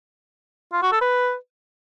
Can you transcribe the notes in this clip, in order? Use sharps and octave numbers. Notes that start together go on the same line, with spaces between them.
F4
F#4
A4
B4